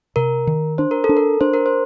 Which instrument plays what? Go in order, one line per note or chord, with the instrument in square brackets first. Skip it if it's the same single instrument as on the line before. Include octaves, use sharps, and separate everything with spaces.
[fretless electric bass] C3 [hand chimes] A#4
[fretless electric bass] D#3
[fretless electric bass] D4 [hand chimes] C5
[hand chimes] A#4
A4
[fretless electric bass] D4
[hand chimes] A#4
[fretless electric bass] D4 [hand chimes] C5
[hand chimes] A#4
C5